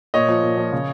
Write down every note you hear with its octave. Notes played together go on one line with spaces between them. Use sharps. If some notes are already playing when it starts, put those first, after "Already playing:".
A#2 C#5 D#5
F3
A#2
F3
C#3